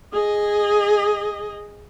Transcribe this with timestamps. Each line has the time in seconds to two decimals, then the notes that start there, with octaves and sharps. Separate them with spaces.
0.13 G#4 D#5